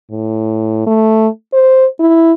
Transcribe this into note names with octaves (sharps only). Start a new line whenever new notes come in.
A2
A3
C5
E4